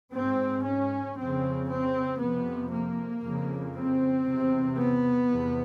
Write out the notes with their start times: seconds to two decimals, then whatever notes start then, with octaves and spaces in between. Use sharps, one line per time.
0.14 G#2 C4
0.66 C#4
1.17 F2 C#3 C4
1.69 C4
2.20 F2 C3 B3
2.72 A#3
3.23 F2 C#3
3.75 C4
4.25 E2 C3
4.77 B3
5.29 E2 C3